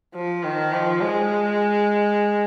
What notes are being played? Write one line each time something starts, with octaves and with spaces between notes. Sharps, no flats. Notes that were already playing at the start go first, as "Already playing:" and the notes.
F3
D#3
F3
G#3